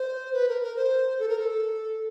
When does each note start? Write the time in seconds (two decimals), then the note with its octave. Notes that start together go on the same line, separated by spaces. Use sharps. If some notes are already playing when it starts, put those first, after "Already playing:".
Already playing: C5
0.34 B4
0.49 A#4
0.62 A#4
0.77 C5
1.19 A4
1.29 A#4
1.39 A4